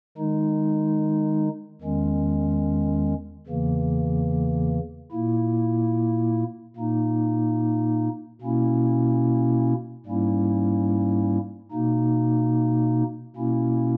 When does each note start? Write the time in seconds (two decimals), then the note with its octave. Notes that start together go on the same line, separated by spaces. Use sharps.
0.17 D#3 G#3 D#4
1.82 E2 D#3 G#3 C#4
3.47 E2 C#3 E3 A#3
5.11 A#2 A#3 E4
6.76 A#2 A#3 D#4
8.42 B2 A#3 C#4 E4
10.06 G#2 G3 A#3 C#4 E4
11.71 B2 A#3 D#4
13.37 B2 A#3 C#4 E4